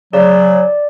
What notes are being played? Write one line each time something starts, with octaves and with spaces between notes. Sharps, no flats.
C#3 F#3 D5